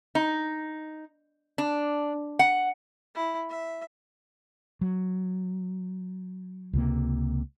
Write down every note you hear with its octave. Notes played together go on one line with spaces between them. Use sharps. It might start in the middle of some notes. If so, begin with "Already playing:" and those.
D#4
D4
F#5
E4
E5
F#3
C#2 C3 A#3